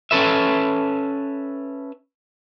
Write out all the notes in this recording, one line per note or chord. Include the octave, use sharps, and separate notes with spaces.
C#4 A4 B4 E5